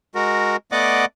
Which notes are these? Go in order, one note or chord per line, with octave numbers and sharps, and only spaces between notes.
G#3 F#4 A#4
A3 B3 D5 D#5 F#5 D6